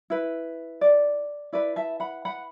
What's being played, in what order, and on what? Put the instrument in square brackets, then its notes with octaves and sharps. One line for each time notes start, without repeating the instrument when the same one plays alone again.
[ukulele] E4 B4
D5
E4 B4 D5
E5 A5
F#5 B5
F#5 B5